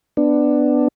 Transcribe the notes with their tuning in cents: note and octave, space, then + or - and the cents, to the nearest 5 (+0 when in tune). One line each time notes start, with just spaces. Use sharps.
B3 +10 D4 +10